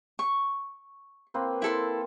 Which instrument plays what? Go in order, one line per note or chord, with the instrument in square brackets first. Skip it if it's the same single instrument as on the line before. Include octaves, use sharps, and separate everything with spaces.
[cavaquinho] C#6
[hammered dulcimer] A#3 C4 B4
[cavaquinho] E4 A4 C6